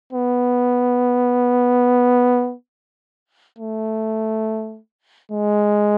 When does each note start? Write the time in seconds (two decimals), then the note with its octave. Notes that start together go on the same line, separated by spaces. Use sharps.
0.13 B3
3.58 A3
5.32 G#3